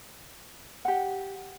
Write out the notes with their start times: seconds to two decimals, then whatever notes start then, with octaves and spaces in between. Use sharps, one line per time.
0.85 G4 F#5